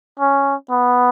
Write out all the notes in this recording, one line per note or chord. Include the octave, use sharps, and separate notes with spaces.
C#4
B3